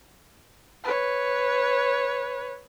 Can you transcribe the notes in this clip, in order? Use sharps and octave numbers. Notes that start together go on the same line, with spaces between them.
B4 C#5